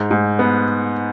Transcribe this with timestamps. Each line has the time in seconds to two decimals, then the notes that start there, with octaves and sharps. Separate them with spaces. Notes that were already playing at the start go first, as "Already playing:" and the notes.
Already playing: G#2
0.11 G#2
0.39 B3